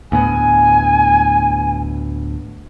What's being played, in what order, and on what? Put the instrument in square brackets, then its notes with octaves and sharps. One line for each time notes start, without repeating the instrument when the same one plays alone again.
[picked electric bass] D2 A2 B3 [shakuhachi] G#5